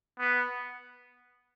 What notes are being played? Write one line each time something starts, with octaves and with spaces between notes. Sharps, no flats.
B3